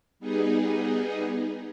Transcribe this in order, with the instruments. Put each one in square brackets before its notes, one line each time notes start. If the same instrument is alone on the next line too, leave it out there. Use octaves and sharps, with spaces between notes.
[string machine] G3 B3 D#4 G#4